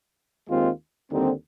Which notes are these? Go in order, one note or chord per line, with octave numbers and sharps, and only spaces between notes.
D#2 D#3 G#3 C4 F4
D#2 D3 G3 C4 D#4